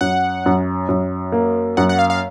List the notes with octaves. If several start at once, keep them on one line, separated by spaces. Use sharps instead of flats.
F#2 F#5
F#2
F#2
A#3
F#2 F#5
F#5
F5
F5